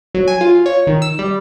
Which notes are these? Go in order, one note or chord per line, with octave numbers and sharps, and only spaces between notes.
F#3
G#5
F4
C#5
D#3
E6
G3